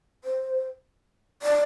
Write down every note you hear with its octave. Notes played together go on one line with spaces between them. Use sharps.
C5
D5